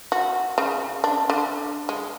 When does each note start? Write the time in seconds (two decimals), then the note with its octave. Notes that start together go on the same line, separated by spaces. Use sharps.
0.12 F#4
0.58 C#3
1.04 D4
1.30 D3
1.89 G#3